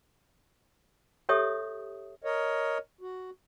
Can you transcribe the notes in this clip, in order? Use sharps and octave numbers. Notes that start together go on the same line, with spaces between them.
G4 A4 C#5 E5 D#6
A#4 C#5 D#5
F#4